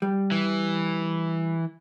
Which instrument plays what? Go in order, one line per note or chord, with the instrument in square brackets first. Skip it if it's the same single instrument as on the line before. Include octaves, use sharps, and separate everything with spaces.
[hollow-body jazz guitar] G3
[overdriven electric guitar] E3